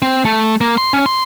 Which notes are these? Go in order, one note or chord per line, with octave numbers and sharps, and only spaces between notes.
C4
A3
A#3
C6
C#4
C6